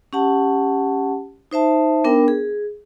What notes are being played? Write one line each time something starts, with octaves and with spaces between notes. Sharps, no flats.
C#4 G4 F#5 A5
D#4 C5 E5 A5
B3 D4 A#4 G5
G#4